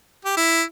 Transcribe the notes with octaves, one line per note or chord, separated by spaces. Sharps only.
G4
E4